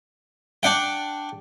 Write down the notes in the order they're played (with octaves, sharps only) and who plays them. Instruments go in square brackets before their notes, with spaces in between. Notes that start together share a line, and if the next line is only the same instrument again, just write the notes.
[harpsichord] D4 F#5 G5